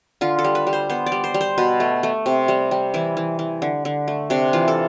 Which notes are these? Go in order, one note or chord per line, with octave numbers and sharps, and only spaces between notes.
D3 F4
A4
G3
B4
G3
C5
B3 C5
D5
G3
C5
G3
C5
B2 B4
A3
A3
C3
G3
G3
E3 E4
E3
E3
D3
D3
A3
C3 D4
E3 F4
A4